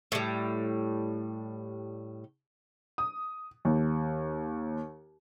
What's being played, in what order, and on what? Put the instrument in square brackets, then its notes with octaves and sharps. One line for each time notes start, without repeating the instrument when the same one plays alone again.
[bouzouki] A2 G3
[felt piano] D#6
D#2